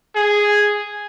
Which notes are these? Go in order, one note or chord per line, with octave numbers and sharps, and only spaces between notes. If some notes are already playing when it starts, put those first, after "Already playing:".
G#4